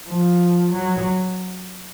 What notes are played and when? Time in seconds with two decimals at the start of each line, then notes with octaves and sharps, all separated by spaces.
0.09 F3
0.72 F#3